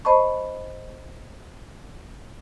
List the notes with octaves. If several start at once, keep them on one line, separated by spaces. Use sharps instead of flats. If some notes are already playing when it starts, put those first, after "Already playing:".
C5 D#5 A5 B5 C#6